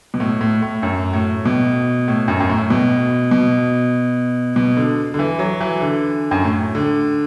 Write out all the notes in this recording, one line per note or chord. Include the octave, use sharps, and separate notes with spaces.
B2
A2
A2
A2
F#2
A2
B2
A2
F#2
F#2
A2
B2
B2
B2
D3
D3
E3
F#3
E3
D3
F#2
A2
D3